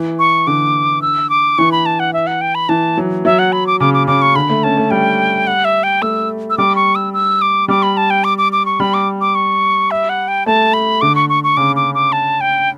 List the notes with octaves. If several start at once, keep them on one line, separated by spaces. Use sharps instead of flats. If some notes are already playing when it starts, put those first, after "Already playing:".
Already playing: E3
C#6
D3 D6
E6
D6
E3 C#6
B5
A5
F#5
E5
F#5
G5
B5
E3 A5
F#3
F#3 E5
F#5
B5
D6
C#3 D6
D6
C#3 D6
C#6
D3 B5
A3
C#4 A5
A3
G3 G5
F#5
E5
G5
A3 E6
E6
G3 D6
C#6
E6
E6
D6
G3 D6
B5
A5
G5
D6
D6
D6
C#6
G3 B5
D6
D6
C#6
E5
F#5
G5
A3 A5
B5
D3 D6
C#6
C#6
C#6
C#3 D6
D6
D6
A5
G5